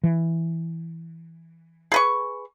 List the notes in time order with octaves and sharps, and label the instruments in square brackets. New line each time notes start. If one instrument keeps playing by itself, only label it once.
[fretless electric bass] E3
[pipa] G#4 B4 C#6